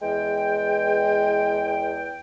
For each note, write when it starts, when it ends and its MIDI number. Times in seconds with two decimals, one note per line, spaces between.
0.02 2.20 40
0.02 2.06 56
0.02 2.20 79